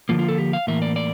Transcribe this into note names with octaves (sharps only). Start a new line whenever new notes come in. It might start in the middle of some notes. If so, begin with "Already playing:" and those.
D3 F3 A#3 F4
F4
A4
G4
F5
A2 E3 A#3 E5
D5
D5